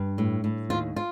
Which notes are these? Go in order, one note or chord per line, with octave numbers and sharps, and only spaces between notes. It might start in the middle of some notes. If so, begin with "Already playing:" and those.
Already playing: G2
A2
A2
D#2 F4
F4